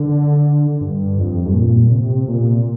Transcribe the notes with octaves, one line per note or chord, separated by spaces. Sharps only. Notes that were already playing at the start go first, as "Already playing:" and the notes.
Already playing: D3
G2
F2
G2
A#2
C3
A#2